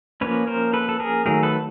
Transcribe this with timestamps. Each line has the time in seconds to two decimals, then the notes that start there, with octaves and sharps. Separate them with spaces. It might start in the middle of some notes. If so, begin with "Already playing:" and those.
0.21 F3 A#3 C#4 B4 C#5
0.47 A#4 C5
0.73 A4 B4
0.89 A4
1.00 G#4 A#4
1.25 D#3 F#3 A3 G#4 A#4
1.43 A4 B4